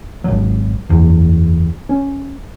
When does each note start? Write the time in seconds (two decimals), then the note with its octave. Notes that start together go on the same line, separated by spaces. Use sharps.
0.24 G#1 F#3
0.89 F#1 E2
1.89 C#4